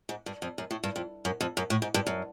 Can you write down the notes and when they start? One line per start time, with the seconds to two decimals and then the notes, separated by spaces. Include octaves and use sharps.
0.09 G#2
0.26 G2
0.42 F2
0.58 F#2
0.71 A2
0.84 G2
0.96 F2
1.25 F#2
1.41 F2
1.57 F#2
1.70 A2
1.82 G#2
1.94 G2
2.07 F#2